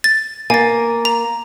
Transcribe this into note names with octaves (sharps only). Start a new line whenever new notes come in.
A6
A#3 G#5 A6
A#5